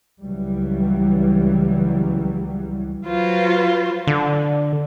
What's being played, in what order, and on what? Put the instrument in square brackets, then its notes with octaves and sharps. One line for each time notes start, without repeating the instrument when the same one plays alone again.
[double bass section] C#2 E3 F#3 G3
[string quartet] F#3 F4 B4 C5
[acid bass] D3